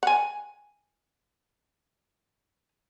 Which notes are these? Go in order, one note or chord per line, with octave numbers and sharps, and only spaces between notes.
F#5 G#5